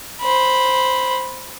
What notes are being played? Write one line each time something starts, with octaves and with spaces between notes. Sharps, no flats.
C5 B5